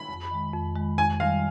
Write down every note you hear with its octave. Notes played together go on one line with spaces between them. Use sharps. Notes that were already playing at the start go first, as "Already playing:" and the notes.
Already playing: B5
F2
D#3 G#3
F2
D#3 G#3
F2 G#5
D#3 G3 F5